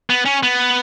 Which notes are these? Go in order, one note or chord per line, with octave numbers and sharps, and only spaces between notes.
B3
C#4
B3